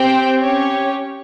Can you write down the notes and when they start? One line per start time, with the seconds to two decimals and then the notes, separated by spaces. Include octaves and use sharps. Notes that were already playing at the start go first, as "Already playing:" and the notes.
Already playing: C4 G4 C5 G5
0.40 C#4 G4 C#5